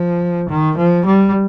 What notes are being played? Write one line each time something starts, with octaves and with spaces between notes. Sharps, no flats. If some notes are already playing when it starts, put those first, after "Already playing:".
Already playing: F3
D#3
F3
G3